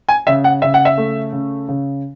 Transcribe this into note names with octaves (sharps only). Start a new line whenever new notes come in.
G#5
C#3 E5
F#5
C#3 E5
F#5
E5
A3
C#3
C#3